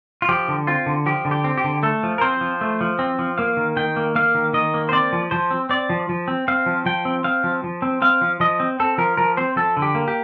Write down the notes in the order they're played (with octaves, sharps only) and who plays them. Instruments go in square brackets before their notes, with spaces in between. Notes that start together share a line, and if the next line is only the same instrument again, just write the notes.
[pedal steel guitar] F4
F3 G4
D3
C4 F4
D3
F3 G4
D3
G4
C4
G4
D3
A3 A4
F3
A#4
C4 C5
F3
A3
F3
C4
F3
A#3 F5
D#3
D#3 G5
A#3
A#3 F5
D#3
D#3 D#5
A#3
C5
C4 D5
F3
F3 C5
C4
C4 D5
F3
F3
C4
C4 F5
F3
F3 G5
C4
C4 F5
F3
F3
C4
C4 F5
F3
F3 D#5
C4
C4 A4
F3 A#4
F3 A#4
C4 C5
F3 A4
D3
G4
A#3
G4